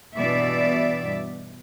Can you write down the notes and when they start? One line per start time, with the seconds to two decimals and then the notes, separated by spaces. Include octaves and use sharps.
0.16 G2 B2 E3 D5 E5